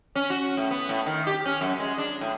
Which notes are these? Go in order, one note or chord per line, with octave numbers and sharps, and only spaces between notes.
C#4
F#4
A2
B3
A2
D#3
G4
C#4
F#2
G#3
D4
A2